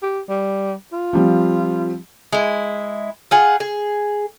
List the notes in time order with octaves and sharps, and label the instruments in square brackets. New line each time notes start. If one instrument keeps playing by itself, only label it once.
[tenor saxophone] G4
G3
F4
[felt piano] F3 G3 C4
[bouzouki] G#3 E4
F4 G#4 F#5
G#4